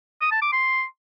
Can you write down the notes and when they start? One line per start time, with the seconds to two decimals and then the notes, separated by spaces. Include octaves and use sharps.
0.21 D#6
0.32 A5
0.42 D6
0.52 C6